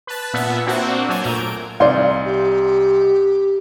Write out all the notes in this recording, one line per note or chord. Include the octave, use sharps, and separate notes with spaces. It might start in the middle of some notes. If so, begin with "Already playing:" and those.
B4 A5
A#2 B3 E5
A#3 C4 D4 F#4
F#3 G#5 A5
A#2 A3 A#5 G6 G#6
D7
C2 D#4 D5 F5 C6
G4